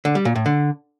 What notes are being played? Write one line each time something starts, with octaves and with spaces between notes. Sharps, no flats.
D3
G3
A#2
A2
D3